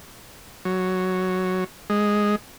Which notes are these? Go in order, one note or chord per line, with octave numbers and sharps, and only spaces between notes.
F#3
G#3